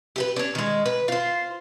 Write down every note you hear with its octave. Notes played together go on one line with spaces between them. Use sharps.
G4 G#4 B4
C#4 D4
D#3 G#3
B4
F4 C5